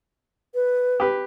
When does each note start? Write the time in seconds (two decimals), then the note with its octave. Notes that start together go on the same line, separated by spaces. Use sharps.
0.55 B4
1.00 G4 B4